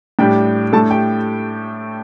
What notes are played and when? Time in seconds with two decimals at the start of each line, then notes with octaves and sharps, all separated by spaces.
0.19 A2 G3 D4 G4 G5
0.73 A2 A3 D4 A4 A5
0.91 G4 G5